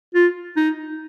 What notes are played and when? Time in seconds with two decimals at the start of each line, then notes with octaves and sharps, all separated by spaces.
0.15 F4
0.56 D#4